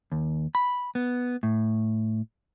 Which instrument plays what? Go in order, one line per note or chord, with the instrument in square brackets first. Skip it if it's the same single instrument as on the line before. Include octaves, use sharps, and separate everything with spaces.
[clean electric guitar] D#2
B5
B3
A2